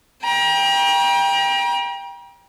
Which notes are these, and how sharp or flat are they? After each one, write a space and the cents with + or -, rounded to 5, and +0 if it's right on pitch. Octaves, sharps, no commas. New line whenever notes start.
G5 +20 A#5 +40